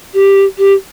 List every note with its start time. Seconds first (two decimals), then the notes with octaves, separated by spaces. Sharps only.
0.13 G4
0.57 G4